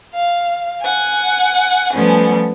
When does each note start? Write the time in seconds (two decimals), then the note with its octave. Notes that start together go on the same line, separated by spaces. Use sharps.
0.14 F5
0.82 F#5 G#5
1.94 F3 G3 A3 B3 C#4